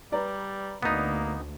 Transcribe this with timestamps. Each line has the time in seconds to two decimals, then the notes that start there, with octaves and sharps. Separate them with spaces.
0.12 G3 B4 D5 A#5
0.83 D2 A#3 B3 D#4